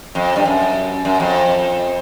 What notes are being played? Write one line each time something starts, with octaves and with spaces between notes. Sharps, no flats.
F2
G2
F#2
F#2
F2